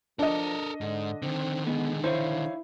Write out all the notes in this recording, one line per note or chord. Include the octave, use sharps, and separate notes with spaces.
F3 D4 A4 A#4 D#5
G#2 D3
D3 D#3 C4
G#3 B3
D#4 E4 C5 C#5 F5